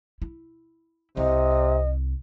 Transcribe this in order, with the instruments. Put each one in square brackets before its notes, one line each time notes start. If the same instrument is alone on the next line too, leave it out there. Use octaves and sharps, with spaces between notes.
[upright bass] E4
[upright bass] C2 [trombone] C3 [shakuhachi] D#5